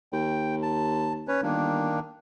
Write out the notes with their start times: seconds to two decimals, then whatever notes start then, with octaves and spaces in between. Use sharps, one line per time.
0.13 D#2 G5
0.62 A5
1.28 C#4 B4 C#5
1.43 G1 D#3 A#3 D4